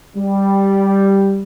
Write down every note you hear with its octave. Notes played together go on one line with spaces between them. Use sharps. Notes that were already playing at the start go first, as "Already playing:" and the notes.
G3